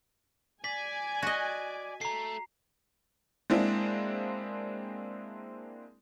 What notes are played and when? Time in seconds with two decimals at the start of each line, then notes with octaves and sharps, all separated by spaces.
0.64 D5 G#5 B6
1.22 F#4 D#5
2.01 A3 A#5 C7
3.50 G#3 A#3 C4 D4 E4